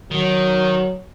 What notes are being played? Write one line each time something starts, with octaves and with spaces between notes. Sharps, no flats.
D#3 F#3